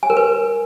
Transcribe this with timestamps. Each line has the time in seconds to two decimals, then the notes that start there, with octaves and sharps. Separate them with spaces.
0.03 G#5
0.10 A#4
0.17 B4